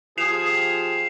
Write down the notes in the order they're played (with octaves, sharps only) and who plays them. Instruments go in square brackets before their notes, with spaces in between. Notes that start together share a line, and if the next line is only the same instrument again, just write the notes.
[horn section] F3 G4 G#4 [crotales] C7 E7 F7